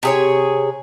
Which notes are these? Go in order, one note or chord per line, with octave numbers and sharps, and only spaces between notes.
C3 G#4 C#5